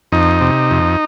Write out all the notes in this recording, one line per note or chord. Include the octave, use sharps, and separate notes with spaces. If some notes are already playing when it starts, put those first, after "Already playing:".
F2 D#4
C3
F2